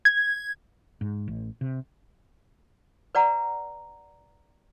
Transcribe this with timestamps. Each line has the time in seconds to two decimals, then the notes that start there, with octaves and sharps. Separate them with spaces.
0.05 G#6
1.01 G#2
1.28 A1
1.61 C3
3.15 B4 D5 F#5 A#5